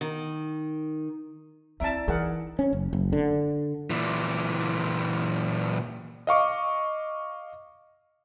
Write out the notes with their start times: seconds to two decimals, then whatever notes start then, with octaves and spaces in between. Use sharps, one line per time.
0.01 D#3
1.80 C4 D#4 E4 D5 E5 A5 A#5
2.08 E3 D#4 G#4 A#4 F#5
2.59 C#4
2.73 F#1
2.93 F#1
3.13 D3
3.90 A#2 E3
6.27 D#5 F5 C#6 D6